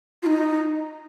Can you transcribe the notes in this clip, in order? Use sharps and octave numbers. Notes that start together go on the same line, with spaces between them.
F4
D#4